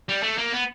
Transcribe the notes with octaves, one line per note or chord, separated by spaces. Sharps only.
G3
A3
A#3
B3